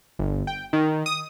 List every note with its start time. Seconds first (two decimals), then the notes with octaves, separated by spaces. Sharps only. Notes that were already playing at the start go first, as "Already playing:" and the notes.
0.19 G1
0.47 G5
0.73 D#3
1.06 D#6